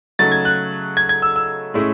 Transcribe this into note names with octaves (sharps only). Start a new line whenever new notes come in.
C#3 F#3 A3 D#4 A6
G#6
F#6
G#6
G#6
E6
E6
A2 G#3 C#4 E4